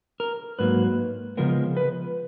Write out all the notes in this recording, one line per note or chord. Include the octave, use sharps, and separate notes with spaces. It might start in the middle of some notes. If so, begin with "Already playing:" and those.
A#4
G#2 F#3 A#3 B4
C#3 F3 G#3 B3 A#4
B4